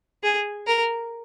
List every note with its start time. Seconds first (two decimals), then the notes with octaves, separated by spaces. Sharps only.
0.23 G#4
0.67 A#4